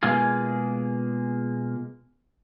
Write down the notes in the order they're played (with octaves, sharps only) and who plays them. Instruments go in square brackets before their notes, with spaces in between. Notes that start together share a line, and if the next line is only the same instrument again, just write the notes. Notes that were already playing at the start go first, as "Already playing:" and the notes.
[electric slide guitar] B2 G#3 A#3 F4 G#4